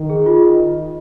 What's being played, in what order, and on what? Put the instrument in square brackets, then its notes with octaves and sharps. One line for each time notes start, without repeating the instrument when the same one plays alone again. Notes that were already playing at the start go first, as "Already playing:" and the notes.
Already playing: [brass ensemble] D#3
[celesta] G#4
F4
D#5